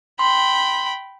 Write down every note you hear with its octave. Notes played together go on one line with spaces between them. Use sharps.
G5 B5 C6